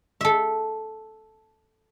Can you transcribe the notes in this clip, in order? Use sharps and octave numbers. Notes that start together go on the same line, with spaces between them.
A4 E5